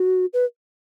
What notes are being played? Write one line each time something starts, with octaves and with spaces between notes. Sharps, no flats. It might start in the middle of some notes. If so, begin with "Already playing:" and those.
Already playing: F#4
B4